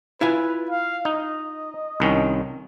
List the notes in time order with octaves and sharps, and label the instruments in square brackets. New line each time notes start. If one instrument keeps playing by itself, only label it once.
[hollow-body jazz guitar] E4 F4 G#5 [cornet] B4
[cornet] F5
[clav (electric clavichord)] D#4 [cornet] D#5
[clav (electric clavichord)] C2 D#3 C#4